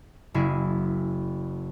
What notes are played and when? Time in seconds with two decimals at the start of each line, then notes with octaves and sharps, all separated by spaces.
0.34 F#1 E4 G#4